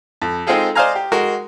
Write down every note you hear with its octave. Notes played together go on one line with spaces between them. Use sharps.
F2
G#3 C4 D#4 F4 G#4 A4
C5 D5 D#5 F5 G#5 A#5
G4
G#3 F#4 A#4